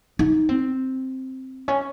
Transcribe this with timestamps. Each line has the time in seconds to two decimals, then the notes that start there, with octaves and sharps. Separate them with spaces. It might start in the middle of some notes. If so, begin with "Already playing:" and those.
0.19 D#4
0.49 C4
1.68 C#4